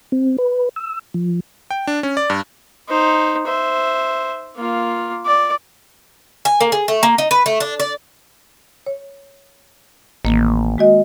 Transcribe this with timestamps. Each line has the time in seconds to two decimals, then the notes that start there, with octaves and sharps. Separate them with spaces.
0.12 C4
0.38 B4
0.76 E6
1.14 F3
1.71 G5
1.87 D4
2.03 C#4
2.17 D5
2.30 G2
2.89 D#4 C5
3.46 C5 E5
4.57 A#3 F4
5.26 D5
6.45 G#5
6.61 A#3
6.72 G#4
6.88 A3
7.03 A#3
7.18 D#4
7.31 B4
7.46 A3
7.60 D4
7.80 D5
8.86 C#5
10.25 A1 D#3 A#3
10.78 G#3 F#4 D#5